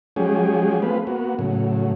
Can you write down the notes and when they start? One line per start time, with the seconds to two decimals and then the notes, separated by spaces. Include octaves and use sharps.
0.16 F3 F#3 G#3 C#4 G4 G#4
0.82 A3 B3 C4 F4 B4
1.07 A#3 B3 F#4
1.39 A2 C#3 F#3